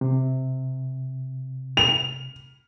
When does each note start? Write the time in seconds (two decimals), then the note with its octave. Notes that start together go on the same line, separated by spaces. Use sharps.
0.01 C3
1.77 F7